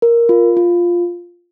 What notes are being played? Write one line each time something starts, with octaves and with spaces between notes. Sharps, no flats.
A#4
F4
F4